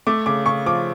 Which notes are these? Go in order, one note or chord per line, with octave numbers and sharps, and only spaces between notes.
A3 D6
C#3 D6
C#3 C#6
F3 D6